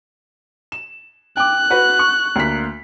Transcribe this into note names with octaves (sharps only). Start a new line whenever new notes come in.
E7
G5 D6 F#6
F#4 B4
C#6
D2 A#3 B6